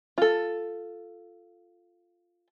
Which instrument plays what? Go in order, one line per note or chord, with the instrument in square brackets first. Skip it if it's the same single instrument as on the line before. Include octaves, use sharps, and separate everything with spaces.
[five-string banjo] F4 A4